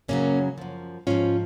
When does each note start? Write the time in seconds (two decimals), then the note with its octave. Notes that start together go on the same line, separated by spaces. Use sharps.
0.08 F#2 C#3 F#3 A#3 C#4
0.58 F#2 F3
1.07 G#2 F3 C#4 F4